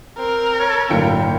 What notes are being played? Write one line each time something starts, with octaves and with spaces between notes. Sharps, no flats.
C4 A#4
C#5
G1 A2 F#3 A#3 G5 C#7